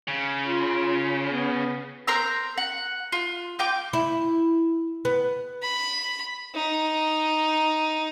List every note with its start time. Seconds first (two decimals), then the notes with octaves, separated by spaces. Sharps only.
0.08 C#3
0.44 F4
1.30 B3
2.07 A#4 C5 A#5 E6
2.58 F#5
3.12 F4
3.59 F4 G5 D6
3.93 E4
5.05 B3
5.62 B5
6.54 D#4